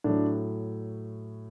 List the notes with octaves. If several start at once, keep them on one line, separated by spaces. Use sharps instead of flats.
A2 F#3 D4